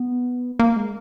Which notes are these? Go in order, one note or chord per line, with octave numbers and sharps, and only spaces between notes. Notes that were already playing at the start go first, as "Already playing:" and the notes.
Already playing: B3
A#3
G#3